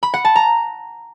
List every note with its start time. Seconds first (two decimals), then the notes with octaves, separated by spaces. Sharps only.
0.03 B5
0.14 F#5
0.25 A5
0.36 A#5